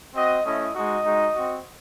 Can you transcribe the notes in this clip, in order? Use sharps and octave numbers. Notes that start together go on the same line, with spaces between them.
C4 F#4 D#5
A3 C#4 E4 D#5
G#3 D#4 F#4 D#5
G#3 D#4 F#4
C4 F#4